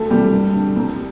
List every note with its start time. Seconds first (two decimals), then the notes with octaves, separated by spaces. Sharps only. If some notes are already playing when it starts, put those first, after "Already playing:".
Already playing: D2 A3 A4
0.10 C3 E3 G3 G4
0.32 G2
0.54 D3 A3
0.76 C2